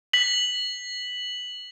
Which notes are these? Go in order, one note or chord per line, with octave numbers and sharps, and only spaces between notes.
B6 F#7